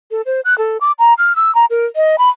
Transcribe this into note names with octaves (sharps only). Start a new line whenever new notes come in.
A4
C5
F#6
A4
D6
A#5
F6
E6
A#5
A#4
D#5
B5